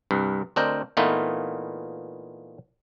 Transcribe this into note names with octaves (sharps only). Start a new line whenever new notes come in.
C2 G2
D2 C4 D4 A#4 D#5 G5
A#2 E3 A3 B3 D#4 F4